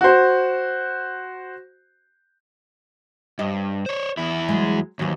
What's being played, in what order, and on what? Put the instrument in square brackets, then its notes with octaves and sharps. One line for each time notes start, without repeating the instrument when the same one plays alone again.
[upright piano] F#4 C5
[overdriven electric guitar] G2 [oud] D#5
[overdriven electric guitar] C5 C#5
E2 E4
[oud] F#3 G#3
[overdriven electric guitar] D#2 [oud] E3 F#3